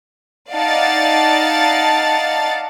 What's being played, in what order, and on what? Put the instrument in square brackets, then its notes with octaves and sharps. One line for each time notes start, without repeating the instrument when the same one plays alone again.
[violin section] D#4 D5 F5 F#5 A5 A6